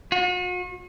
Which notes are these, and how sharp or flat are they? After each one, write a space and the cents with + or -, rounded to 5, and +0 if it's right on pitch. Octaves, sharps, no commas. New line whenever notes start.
F#4 -45